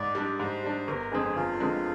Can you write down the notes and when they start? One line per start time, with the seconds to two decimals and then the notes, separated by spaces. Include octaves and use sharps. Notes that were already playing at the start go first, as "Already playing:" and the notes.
Already playing: G#2 D5
0.15 G3 D4
0.40 G#2 C5
0.64 G3 D4
0.87 G1 A#4
1.11 F2 D3 G#3 C4 G#4
1.35 G1 F4
1.60 F2 D3 G#3 C4